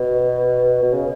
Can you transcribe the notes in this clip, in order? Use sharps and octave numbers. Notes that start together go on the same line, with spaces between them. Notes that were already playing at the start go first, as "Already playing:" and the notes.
Already playing: B2
B2
C#3